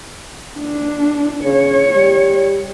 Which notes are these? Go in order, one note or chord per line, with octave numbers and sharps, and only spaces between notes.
D4
C#3 C#5
G3